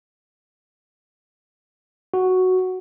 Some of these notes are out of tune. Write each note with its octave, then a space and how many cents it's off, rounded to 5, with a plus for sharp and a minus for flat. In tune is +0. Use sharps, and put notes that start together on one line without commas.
F#4 +0